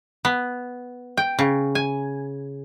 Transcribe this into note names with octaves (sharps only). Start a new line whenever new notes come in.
B3
G5
C#3
G#5